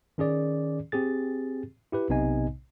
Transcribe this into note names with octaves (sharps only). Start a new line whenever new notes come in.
D#3 C#4 G#4 D5
C4 G4 G#4 A6
E4 G4 B4
B1 C3 B3 D#4 D#5 G#5